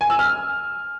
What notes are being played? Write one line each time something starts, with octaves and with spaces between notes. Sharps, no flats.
G#5
E6
F6